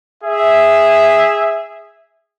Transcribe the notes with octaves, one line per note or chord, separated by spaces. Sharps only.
G#4 E5